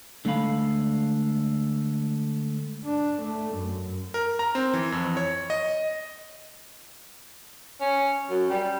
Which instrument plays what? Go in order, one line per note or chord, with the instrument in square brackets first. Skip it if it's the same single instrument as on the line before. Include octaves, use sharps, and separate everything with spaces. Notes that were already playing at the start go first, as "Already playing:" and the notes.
[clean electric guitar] D3 G#3 A3 F5 B5
[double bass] D4
A3
F#2
[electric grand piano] A#4
A#5
C4
E3
F2
C#5
D#5
[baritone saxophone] C#4
F#2
G3